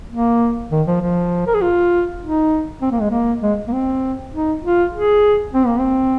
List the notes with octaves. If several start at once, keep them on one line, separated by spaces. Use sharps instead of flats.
A#3
D#3
F3
F3
A#4
G#4
F4
D#4
C4
A#3
G#3
A#3
G#3
A#3
C4
D#4
F4
G#4
C4
A#3
C4